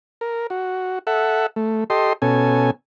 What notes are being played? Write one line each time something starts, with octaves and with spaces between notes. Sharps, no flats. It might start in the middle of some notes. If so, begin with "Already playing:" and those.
A#4
F#4
A4 E5 F#5
A3
G4 A4 D#5 C6
B2 C#4 A4 G#5